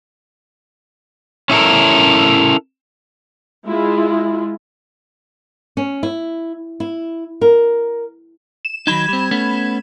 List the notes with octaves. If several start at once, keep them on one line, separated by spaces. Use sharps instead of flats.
C#4 E4 A4 A#4
G#3 E4 F4
C#4
E4
E4
A#4
E7
D#3 F#3 D#4 B5 G#6 E7
G3 C4
A3 B3 C#4